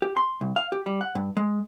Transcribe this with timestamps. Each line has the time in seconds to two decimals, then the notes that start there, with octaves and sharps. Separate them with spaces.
0.02 G4
0.17 C6
0.41 C2
0.56 F5
0.72 G4
0.86 G3
1.01 F#5
1.15 G2
1.37 G#3